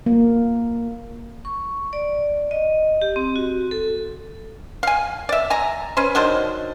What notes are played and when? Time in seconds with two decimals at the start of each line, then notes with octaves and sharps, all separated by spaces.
0.06 A#3
1.45 C#6
1.93 D5
2.51 D#5
3.02 G4
3.16 C4
3.36 F#4
3.71 A4
4.83 F5 G#5
5.29 D5 E5
5.50 G#5 A#5
5.97 C#4 B4 C5
6.15 D#3 F#3 D4 C5